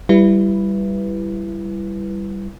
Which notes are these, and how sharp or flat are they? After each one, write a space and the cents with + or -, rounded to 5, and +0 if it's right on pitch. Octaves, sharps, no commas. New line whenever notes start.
G3 +0 E4 +20 B4 +0